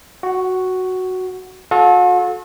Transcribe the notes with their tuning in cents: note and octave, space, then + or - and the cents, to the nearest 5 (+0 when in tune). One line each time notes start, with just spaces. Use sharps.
F#4 +0 F#5 +25
F#4 -45 A4 -25